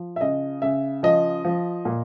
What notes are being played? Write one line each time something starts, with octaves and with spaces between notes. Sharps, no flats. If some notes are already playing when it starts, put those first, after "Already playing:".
Already playing: F3
E5
C#3 D#5
C#3 E5
F3 D#5
F3
A#2